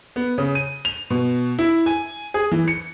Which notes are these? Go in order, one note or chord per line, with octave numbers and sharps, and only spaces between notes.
B3
C#3
D#7
F7
B2
E4
G#5
G#4
E3
C#7